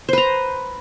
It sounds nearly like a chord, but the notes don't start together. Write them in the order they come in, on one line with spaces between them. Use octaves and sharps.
C5 B4 A#5